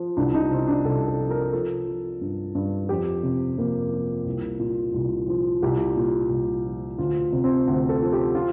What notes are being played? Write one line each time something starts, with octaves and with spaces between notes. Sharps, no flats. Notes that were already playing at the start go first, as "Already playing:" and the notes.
Already playing: F3
C2 D4
D#4
C3 C4
D4
C2 A4
A4
F3
A#4
F3 A4
F3
G2
G2
F2 G4
C3
F2 A#3
F3
C2
A#2
C2
F3
C2 G4
A#2
C2
F3
D2 F4
C3
C4
D2
A4
F3
G4
F4